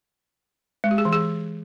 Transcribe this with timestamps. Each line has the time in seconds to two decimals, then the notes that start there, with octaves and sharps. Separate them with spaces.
0.84 G#3
0.91 G4
0.98 G#4
1.05 E3
1.12 G#4